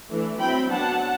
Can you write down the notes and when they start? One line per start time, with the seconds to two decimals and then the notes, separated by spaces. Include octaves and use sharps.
0.09 E3 A3 D4
0.38 F#3 C4 E4 G5 B5
0.68 F#3 B3 D4 F#5 A5